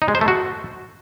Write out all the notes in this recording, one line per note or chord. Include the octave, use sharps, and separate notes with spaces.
D#4
G#3
C5
A3
F#4